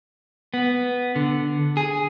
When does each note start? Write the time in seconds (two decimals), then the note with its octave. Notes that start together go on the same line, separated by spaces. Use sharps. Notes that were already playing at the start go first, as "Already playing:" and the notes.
0.54 B3
1.16 D3
1.77 G#4